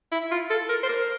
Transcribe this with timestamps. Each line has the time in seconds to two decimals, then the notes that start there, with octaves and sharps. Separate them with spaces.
0.12 E4
0.32 F4
0.50 A4
0.69 A#4
0.83 C5
0.89 A#4